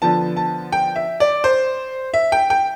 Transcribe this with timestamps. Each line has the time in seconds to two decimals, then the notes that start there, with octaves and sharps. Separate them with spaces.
0.02 D3 F3 B3 A5
0.36 A5
0.72 G5
0.96 E5
1.20 D5
1.44 C5
2.14 E5
2.32 G5
2.50 G5